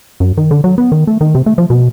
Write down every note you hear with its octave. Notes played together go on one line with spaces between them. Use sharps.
F#2
D#3
D3
F#3
B3
D#3
A3
D#3
C3
A3
F3
B2